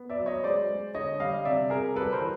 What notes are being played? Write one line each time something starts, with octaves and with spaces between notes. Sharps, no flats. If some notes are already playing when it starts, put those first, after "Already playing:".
Already playing: B3
D5 E5
F#3
C#5 D#5
G#3 C5 D5
G#3
D3 C#5 D#5
G3 D#5 F5
C3 D5 E5
C3 G#4 A#4
G3 A4 B4
A#4 C5
E3